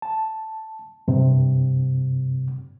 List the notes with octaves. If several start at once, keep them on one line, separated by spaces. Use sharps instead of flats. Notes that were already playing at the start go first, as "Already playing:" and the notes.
A5
G2 C3